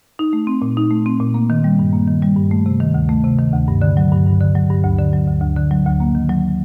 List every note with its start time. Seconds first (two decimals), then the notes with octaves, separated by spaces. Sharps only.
0.19 D#4
0.33 A3
0.47 C4
0.62 A#2
0.77 D#4
0.91 A3
1.06 C4
1.20 A#2
1.34 A#3
1.50 D#3
1.64 G3
1.79 G2
1.93 A#3
2.08 D#3
2.22 G3
2.36 G2
2.51 A3
2.66 C3
2.80 D#3
2.94 D2
3.09 A3
3.24 C3
3.39 D#3
3.53 D2
3.68 G2
3.82 D3
3.97 F#3
4.11 G2
4.26 G2
4.41 D3
4.55 F#3
4.70 G2
4.83 D2
4.98 D3
5.13 F#3
5.28 D2
5.41 D2
5.56 D3
5.71 F#3
5.86 D2
6.00 A#3
6.15 D#3
6.30 F#3